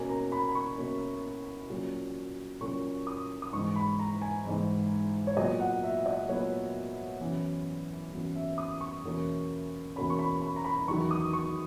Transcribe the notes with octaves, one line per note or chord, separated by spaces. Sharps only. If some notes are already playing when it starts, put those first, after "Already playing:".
Already playing: B2 A#3 C#4 G#5
A#5
B5
B5
C#6
B2 A#3 C#4
A#2 F#3 A#3 C#4
A#2 F#3 A#3 C#4 C#6
D#6
D#6
G#2 E3 G#3 C#6
B5
A#5
G#5
G#2 E3 G#3
C#5
A#2 F#3 B3 D#5
F#5
E5
D#5
A#2 F#3 B3 C#5
F#2 E3 B3
F#2 E3 B3
E5
D#6
C#6
E2 B2 A#3 C#4
E2 B2 A#3 C#4 B5
C#6
B5
B5
A#5
B5
E2 D#3 F#3 C#6
D#6
C#6